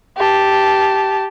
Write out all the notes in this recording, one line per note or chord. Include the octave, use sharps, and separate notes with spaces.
G4 A5